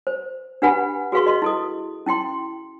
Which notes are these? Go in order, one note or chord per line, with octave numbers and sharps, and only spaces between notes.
C5
D4 G4 B4 F#5 G#5 B5
F#4 G#4 B4 F5 C6 C#6
D#5 C6
E4 A4 D#6
C#4 E4 G5 C6